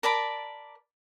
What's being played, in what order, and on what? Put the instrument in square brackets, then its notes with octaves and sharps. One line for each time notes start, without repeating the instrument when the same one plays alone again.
[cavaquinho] A#4 D5 A5 B5